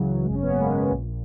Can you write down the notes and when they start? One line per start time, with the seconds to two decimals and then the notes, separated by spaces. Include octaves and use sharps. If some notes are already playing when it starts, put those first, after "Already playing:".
Already playing: C#2 C#3 E3 F#3
0.25 G#1 F#2 C#3 G#3
0.35 C#4
0.43 B3
0.50 A#3
0.58 G#3
0.91 A#1 A#2